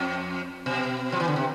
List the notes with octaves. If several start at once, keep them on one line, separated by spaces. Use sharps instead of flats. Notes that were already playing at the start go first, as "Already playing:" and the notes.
Already playing: F2
B2
F3
E3
D3
C3